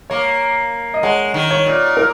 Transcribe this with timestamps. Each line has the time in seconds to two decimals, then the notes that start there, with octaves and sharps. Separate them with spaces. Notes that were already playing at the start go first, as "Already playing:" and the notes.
0.10 A#3 C#5
0.94 D#5
1.03 G#3 C#5 F#5
1.34 D#3
1.51 C#5
1.66 A#2
1.97 A#4